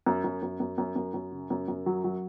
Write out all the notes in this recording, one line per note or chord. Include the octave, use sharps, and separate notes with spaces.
F#2
F#2
F#2
F#2
F#2
F#2
F#2
C#3
F#2
F#2
F#3
F#3